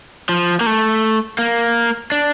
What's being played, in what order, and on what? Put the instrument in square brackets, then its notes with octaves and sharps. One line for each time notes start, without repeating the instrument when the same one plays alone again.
[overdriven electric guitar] F3
A#3
A3
A#3
D4